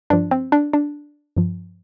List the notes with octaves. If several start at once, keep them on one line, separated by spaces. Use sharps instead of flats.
G2 F3 D4
C4
D4
D4
G2 F3